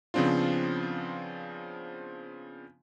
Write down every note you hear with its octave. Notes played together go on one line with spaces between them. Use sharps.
C#3 F3 B3 C4 D4 F4